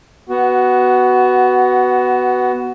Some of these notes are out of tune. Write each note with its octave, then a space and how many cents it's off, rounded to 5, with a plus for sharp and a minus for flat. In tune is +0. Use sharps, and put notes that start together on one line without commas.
B3 +0 F#4 +15